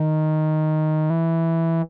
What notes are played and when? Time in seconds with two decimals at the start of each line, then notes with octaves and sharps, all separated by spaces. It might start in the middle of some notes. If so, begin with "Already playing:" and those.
Already playing: D#3
1.10 E3